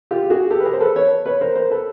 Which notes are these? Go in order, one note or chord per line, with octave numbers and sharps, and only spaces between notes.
F4 G4
G4
F#4 G#4
G4 A4
B4
G#4 A#4
C5
A4 B4
B4 C#5
B4 C#5
A#4 C5
A#4 C5
A4 B4